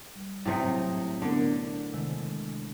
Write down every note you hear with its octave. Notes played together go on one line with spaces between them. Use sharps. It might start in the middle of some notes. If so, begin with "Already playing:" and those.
G3
A2 C3 F#3 D#4
D3 B3 D4 A#4
C3 D#3 G#3